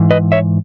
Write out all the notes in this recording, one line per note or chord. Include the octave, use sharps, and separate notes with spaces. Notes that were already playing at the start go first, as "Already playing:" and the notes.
Already playing: G#2 E3
B4 D#5
C#5 E5